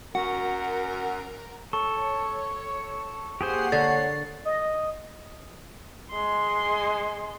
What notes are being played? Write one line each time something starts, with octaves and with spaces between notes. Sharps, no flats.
F#2 F#4 A#4 F#5
A4 C#5 C#6
A#3 G4 G#4 C5 F#5 C7
D3 C#5 A6
D#5
G#3 C6